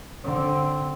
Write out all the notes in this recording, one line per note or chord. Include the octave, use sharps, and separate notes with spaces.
D3 C4